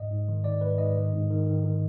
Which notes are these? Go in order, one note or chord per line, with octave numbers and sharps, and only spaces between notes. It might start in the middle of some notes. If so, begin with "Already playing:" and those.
Already playing: G#2 D#5
G#2
D#3
D#3 D5
G#2 B4
G#2 D#5
D#3
G#2
D#3
D#3
D#3